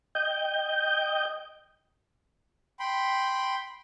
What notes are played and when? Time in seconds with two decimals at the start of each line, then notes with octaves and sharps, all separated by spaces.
0.15 D#5 G5 G6
2.79 G5 B5 C6